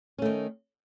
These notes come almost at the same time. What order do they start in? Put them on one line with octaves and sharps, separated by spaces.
C#4 A3 D#3